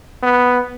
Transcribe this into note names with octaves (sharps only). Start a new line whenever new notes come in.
B3